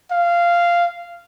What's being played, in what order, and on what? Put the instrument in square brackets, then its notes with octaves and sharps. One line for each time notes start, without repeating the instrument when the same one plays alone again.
[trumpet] F5